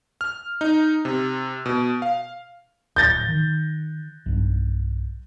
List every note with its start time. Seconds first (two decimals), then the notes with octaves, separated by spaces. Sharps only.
0.21 F6
0.61 D#4
1.05 C3
1.66 B2
2.02 F5
2.96 D1 G6 A6 A#6
3.28 D#3
4.26 B1 G2